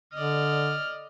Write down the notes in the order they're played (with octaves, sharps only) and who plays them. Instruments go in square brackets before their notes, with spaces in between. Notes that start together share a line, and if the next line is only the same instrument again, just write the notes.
[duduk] D3 [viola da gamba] D5 D#5 [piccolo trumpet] F6